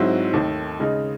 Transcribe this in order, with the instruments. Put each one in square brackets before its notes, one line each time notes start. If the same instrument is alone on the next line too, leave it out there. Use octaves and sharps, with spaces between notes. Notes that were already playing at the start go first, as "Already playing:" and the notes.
Already playing: [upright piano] G#2 F#3 C4 E4
D#2 D#3 A3
C#3 G#3 D#4